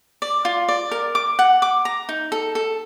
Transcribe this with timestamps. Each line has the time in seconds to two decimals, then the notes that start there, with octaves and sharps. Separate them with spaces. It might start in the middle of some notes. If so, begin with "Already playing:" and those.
0.22 D5
0.45 F4
0.68 D5
0.91 A#4
1.15 D6
1.39 F#5
1.62 D6
1.85 A#5
2.09 D#4
2.32 A4
2.55 A4